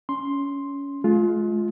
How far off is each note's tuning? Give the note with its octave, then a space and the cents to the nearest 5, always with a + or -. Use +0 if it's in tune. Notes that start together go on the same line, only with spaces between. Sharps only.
C#4 +20 C6 +5
G#3 +35 F4 +0